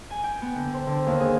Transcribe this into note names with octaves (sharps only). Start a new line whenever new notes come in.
G#5
G5
B3
D3
C5
D3
D#2
G#4